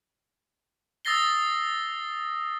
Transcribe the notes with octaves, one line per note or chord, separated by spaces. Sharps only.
D#6 E6 A6 A#6 C7 G7